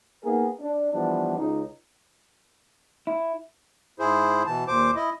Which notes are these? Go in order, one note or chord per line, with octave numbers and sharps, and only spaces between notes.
A#3 B3 D#4 G#4 A#4
D4
E3 F3 G3 B3 D4
C#2 D#4
E4
G#2 E4 G#4 C5
B2 E3 A5
D#2 A#2 C5 D6
E4 D#5